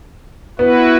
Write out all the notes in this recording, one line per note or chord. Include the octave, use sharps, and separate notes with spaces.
B3 E4 F#4 B4